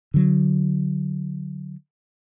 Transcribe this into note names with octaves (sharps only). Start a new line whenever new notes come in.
D3 F#3